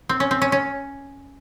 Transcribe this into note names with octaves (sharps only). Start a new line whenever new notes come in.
C4
C#4
C4
C#4
C#4